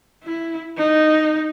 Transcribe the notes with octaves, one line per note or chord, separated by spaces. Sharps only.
E4
D#4